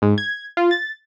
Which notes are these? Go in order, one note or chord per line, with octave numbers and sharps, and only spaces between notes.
G#2
G#6
F4
A6